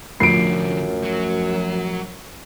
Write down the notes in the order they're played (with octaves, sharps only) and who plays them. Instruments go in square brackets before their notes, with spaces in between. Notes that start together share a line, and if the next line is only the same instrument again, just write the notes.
[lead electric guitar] C2 D3 [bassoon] F#2 [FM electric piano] A2 F3 A3 [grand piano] C7 D7
[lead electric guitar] F#3